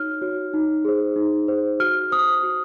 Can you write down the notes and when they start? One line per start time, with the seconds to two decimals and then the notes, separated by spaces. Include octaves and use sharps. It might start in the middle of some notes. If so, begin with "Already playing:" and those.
Already playing: D#4 F#4 C#5 F6
0.22 F#4 C#5
0.53 D#4
0.85 G#4 C5
1.16 D#4
1.48 G#4 C5
1.80 F#4 F6
2.11 C5 D#6
2.43 F#4